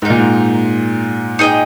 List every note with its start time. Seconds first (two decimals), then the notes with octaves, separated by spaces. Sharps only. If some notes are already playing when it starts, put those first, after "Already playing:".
0.02 G#2 C4
0.05 A#2 D#4 A#4
0.18 G#2
1.39 D#4 G#4 D#5 G5